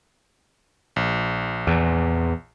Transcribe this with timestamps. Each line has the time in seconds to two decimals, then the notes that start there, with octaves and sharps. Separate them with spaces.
0.96 A#1
1.67 E2